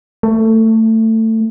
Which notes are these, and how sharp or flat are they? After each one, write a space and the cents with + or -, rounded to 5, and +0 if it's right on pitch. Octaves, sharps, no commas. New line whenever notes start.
A3 +20